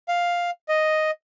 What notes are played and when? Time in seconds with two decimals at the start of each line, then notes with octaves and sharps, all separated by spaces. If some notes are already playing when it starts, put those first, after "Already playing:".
0.08 F5
0.69 D#5